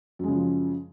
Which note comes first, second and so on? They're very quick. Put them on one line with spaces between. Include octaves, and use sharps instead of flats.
F#2 G#3 C#3 F3